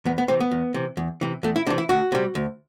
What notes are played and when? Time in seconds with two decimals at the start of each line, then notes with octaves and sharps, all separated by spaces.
0.05 E2 B3
0.18 B3
0.28 C3 E3 C4
0.40 B3
0.51 E2
0.74 C3 E3
0.97 E2
1.21 C3 E3
1.43 E2 A3
1.56 E4
1.66 C3 D4
1.70 E3
1.78 E4
1.89 D2 F#4
2.12 C3 G3
2.35 D2